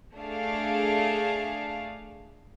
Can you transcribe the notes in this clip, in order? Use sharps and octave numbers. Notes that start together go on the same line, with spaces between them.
A3 D4 G#4 F5